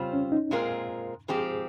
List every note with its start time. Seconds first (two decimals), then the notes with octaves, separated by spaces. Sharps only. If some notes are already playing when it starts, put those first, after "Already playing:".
Already playing: C#3 G3 C4 F4 C5
0.13 C#4
0.32 D#4
0.51 A#2 G#3 C4 F4 A#4
1.28 G#2 F3 C4 G4 G#4